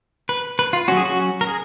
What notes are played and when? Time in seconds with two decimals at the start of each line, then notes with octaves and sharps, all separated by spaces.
0.29 B4
0.59 B4
0.73 F4
0.88 F#3 C#4 F#4
0.97 G#4
1.05 F#4
1.41 A#4
1.47 G#4